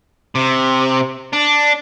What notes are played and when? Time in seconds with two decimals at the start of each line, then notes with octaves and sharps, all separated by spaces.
0.35 C3
1.33 D4